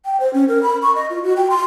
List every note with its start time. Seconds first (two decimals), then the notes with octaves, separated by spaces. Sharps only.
0.05 G5
0.20 C5
0.33 C#4
0.48 A#4
0.63 B5
0.83 C#6
0.95 D#5
1.10 F4
1.23 F#4
1.36 G5
1.50 C6